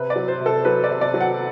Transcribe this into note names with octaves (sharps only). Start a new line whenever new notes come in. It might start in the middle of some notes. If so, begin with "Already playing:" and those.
Already playing: C3 B4
D5
F#3
C5
C3
A4
F#3 B4
D5
C3
D5
F#3
F#5